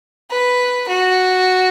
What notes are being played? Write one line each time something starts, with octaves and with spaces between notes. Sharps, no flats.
B4
F#4